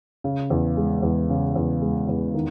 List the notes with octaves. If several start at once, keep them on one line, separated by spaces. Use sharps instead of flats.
C#3
E2
G#3
E2
C#3
E2
G#3
E2
D#3